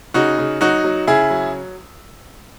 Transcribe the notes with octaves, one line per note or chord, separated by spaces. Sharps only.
C#3 D#4 F#4
C#3
F#3 D#4 F#4
F#3
C#3 E4 G#4
F#3